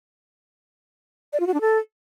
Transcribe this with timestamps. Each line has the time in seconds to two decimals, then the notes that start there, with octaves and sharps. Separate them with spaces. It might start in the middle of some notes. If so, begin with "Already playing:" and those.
1.33 D5
1.40 F4
1.47 F#4
1.54 D4
1.61 A4